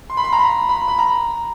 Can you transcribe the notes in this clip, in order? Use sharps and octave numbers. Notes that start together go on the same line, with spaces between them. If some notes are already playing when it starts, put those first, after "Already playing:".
C6
B5
C6
A#5
B5
B5
B5
A#5